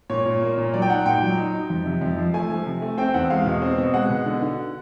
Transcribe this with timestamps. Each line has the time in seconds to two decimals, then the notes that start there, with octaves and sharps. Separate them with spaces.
0.10 A#2 C#5
0.26 A#2
0.42 A#3
0.58 A#2
0.74 F#3 D5
0.82 G5
0.90 D#4 F#5
1.06 A#2 G5
1.22 F#3
1.38 D#4
1.54 D#4
1.70 F2
1.86 C3
2.02 F2
2.17 F3
2.34 A3 G#5
2.50 F3
2.66 C3
2.82 A3
2.98 C4 G5
3.14 E2 F#5
3.30 G#3 F5
3.46 B2
3.62 C4
3.78 B2
3.94 G#3 F#5
4.10 B2
4.26 D3
4.42 D3